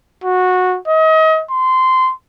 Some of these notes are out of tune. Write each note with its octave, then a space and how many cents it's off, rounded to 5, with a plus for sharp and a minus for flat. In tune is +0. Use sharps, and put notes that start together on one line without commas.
F#4 -15
D#5 +35
C6 -15